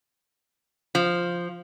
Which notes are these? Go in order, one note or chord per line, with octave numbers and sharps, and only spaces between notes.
F3